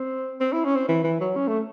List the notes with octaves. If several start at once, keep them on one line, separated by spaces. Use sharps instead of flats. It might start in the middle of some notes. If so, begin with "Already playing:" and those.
Already playing: C4
C4
E4
C#4
C4
E3
E3
F#3
C#4
A3